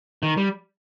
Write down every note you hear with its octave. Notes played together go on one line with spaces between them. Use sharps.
D#3
G3